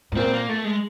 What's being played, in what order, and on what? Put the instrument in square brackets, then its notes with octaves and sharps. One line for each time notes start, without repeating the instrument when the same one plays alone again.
[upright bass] A2
[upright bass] A#2 [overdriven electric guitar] C4
[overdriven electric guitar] A#3
A3
G#3